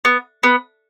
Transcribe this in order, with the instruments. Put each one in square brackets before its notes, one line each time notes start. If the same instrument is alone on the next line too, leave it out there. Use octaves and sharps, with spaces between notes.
[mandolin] B3
B3